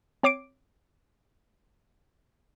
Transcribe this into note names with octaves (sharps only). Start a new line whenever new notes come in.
C4 C#5 D6 C7 D7